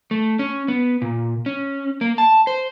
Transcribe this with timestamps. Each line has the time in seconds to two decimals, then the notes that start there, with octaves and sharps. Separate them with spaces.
0.11 A3
0.39 C#4
0.68 B3
1.02 A#2
1.46 C#4
2.01 A#3
2.18 A5
2.47 C5